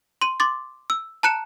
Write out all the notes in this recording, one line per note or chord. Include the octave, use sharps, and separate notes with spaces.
C6 D#7
C6 D6 A6
E6
A5 A#5 F#6 C#7 E7